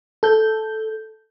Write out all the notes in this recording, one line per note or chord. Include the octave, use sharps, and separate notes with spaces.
A4 G6